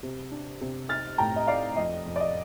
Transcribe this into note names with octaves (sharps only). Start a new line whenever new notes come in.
C3
D4
C3
D#4 F6 A6
A2 G5 A#5
D#5
D#4 D5 F5
F2 D#5
F2
D5
D#5